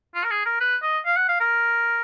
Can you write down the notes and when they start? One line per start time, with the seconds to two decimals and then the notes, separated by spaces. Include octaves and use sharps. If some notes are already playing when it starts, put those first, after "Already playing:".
0.15 F4
0.24 A#4
0.31 G#4
0.45 A#4
0.60 B4
0.82 D#5
1.06 F5
1.17 F#5
1.29 F5
1.40 A#4